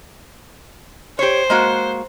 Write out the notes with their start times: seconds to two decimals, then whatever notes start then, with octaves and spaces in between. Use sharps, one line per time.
1.19 G4 C5 C#5
1.50 G#3 A#3 F#4